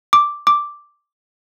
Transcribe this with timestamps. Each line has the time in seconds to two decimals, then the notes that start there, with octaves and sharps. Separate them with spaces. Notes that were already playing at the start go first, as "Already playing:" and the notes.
0.13 D6
0.47 D6